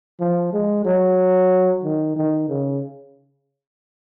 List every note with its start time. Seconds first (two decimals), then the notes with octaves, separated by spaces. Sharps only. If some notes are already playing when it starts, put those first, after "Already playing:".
0.20 F3
0.53 G#3
0.85 F#3
1.84 D#3
2.16 D#3
2.49 C#3